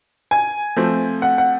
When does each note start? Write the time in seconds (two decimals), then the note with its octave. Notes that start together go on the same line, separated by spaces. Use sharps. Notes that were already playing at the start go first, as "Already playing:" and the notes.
0.31 G#5
0.76 F3 A3 C4
1.22 F#5
1.38 F#5